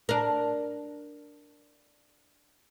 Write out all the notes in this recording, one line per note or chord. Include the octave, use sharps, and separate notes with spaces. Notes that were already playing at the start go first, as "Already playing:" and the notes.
D4 A#4